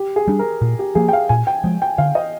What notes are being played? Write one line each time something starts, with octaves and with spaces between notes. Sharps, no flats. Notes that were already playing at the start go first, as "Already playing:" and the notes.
Already playing: G4
G#4
G3 D4
A#4
A#2
G4
F3 A#3 G#4
G5
F5
A#2 G#5
G5
F3 G#3
G5
D3 F5
D#5